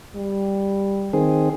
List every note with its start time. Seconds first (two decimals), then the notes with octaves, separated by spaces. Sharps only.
0.16 G3
1.13 D#3 C4 G#4